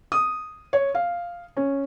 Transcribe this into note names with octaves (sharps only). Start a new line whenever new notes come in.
D#6
C#5
F5
C#4